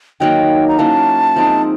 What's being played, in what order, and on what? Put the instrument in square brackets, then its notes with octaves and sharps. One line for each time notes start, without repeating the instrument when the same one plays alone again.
[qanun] D#3 F#3 A#3 [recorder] G5
[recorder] A#5
[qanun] F#3 A#3 C#4 E4 [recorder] A5
[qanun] F3 G#3 C4 D#4